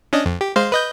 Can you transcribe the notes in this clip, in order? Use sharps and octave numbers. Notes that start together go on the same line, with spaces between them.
C#4 D4 D#5
F2
G4
G#3 C5 F5
B4 D#5 G6